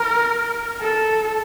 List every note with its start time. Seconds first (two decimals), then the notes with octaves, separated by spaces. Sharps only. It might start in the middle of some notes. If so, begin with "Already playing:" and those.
Already playing: A#4
0.81 A4